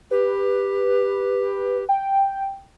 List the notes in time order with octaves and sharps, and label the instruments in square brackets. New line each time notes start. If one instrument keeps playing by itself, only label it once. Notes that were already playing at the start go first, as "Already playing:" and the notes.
[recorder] G4 [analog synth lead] B4
[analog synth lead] G5